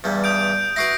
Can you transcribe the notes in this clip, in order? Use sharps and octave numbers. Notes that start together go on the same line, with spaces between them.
E2 G2 G3
D#6 G6 D7
E4 F#4 B4 A#6 C7 D7